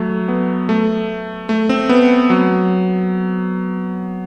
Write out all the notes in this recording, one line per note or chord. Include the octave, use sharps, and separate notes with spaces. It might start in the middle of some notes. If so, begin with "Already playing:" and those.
Already playing: F#3 A3
B3
A3
A3
C4
B3
F#3